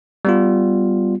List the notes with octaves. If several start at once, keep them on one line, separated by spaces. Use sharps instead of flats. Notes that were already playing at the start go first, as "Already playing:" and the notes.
G3 B3 F4